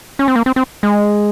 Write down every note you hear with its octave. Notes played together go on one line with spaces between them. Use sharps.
C#4
C4
A#3
C4
C4
G#3